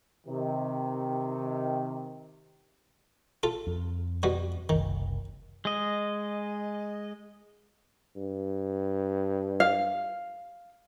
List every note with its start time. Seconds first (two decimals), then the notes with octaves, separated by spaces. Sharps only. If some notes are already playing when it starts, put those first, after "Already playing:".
0.27 C3 D#3
3.43 F4 A4
3.67 F2
4.23 B2 G3 F#4
4.69 F#1 C2 D#3
5.65 G#3 D#5
8.16 G2
9.60 F5